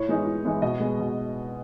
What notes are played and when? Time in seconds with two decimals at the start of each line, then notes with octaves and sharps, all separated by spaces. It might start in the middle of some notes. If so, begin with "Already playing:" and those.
Already playing: A2 C#5
0.08 E3 G#3 B3 D#4
0.26 A2
0.45 E3 G#3 B3 D#4
0.62 B2 D#5
0.80 G#3 B3
1.00 B2